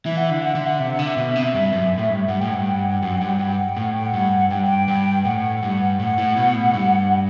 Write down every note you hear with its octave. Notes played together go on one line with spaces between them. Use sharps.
E3 E5
F#5
D3 E5
F#5
D3 E5
F#5
C3 E5
F#5
D3 E5
B2
C3
G2 E5
F#2
A2
G2
G2 F#5
A2 G5
G2 F#5
G5
F#5
G5
F#2 F#5
G2 G5
F#5
G2 G5
F#5
G5
A2 F#5
G5
F#5
G2
G2 G5
G5
G2
A2 F#5
G2
A2 F#5
A2
B2
A2
G2